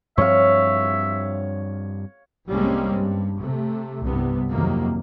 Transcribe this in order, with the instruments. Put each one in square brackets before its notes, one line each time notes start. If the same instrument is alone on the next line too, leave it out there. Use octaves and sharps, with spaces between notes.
[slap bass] G2 F3 C4 [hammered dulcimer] C#5 F5 [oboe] E5
[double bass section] C2 G3 G#3 A#3 C4 C#4
G2
C3 A3
C2 G2 C3 B3
C2 F2 C3 D#3 F#3 A#3